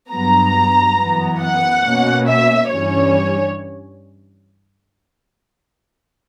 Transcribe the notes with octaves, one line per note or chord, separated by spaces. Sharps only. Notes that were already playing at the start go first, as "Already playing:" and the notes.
G2 F#3 B3 A#5
F#2 E3 B3
F#5
B2 A#3 C#4
E5
G2 E3 G3 C#4 C#5